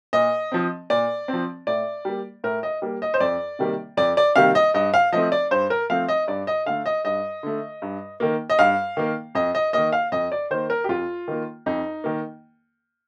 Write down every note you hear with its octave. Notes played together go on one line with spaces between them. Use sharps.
A#2 D#5
F3 C4
A#2 D5
C4
F3
A2 D5
G3 A#3
A2 A#4
D#5
G3 A#3
D#5
C5
F2 D5
C3 D#3 G3 A#3
F2 D5
D5
C3 D#3 G3 A#3 F5
D#5
G2 D#5
F5
F3 A3 C4 D#5
D5
G2 C5
A#4
F3 A3 C4 F5
D#5
G2 D5
D#5
D3 A3 F5
D#5
G2 D#5
D3 A3
G2
D#3 A#3
D#5
G2 F5
D#3 A#3
F2 D#5
D#5
D#3 A#3 D#5
F5
F2 D#5
D5
D#3 A#3 C5
A#4
G4
F2 F4
D#3 A#3
F2 D#4
D#3 A#3